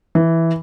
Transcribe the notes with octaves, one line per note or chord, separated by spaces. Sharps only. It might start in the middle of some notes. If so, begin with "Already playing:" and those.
E3